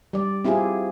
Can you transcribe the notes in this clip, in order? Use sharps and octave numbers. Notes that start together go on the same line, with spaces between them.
G3 D5
C4 E4 F4 G4 G#4